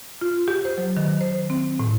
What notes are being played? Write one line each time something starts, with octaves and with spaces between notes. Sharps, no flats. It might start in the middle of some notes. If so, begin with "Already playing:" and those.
F4
G4
C5
F#3
D#3
C5
C4
A2